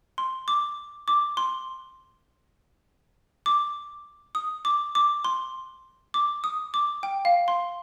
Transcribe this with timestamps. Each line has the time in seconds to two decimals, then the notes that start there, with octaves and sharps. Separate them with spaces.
0.18 C6
0.48 D6
1.08 D6
1.37 C6
3.46 D6
4.35 D#6
4.65 D6
4.95 D6
5.25 C6
6.14 D6
6.44 D#6
6.74 D6
7.03 G5
7.25 F5
7.48 C6